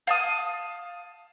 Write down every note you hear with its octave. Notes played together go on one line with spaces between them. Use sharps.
F5 A5 D#6